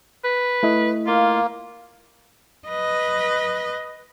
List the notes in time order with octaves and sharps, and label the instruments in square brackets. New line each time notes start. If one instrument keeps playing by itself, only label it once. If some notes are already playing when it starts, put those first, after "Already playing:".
[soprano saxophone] B4
[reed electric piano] A3 E4 D#5
[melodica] A#3 [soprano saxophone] F4
[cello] B4 D#5